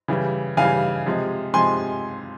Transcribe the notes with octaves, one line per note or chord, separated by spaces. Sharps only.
C#3 E3 G3
C#3 E3 G3 F5 G#5
C3 F3 G#3
C3 F3 G#3 G#5 C6